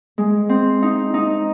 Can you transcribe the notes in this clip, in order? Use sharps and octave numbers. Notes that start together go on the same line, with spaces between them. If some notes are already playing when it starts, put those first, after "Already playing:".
G#3
C4
D#4
D#4